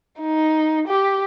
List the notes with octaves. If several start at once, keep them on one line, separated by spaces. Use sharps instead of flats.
D#4
G4